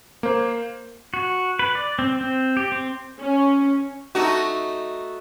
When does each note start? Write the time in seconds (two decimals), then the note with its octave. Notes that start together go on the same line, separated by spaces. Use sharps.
0.23 A#3 C5
1.14 F#4
1.59 B4
1.75 D5
1.99 C4
2.21 C4
2.57 G4
2.72 C4
3.20 C#4
4.15 A3 D#4 F#4